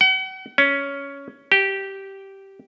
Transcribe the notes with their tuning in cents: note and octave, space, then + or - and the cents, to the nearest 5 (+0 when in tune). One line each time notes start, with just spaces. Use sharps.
F#5 +40
C#4 +10
G4 -10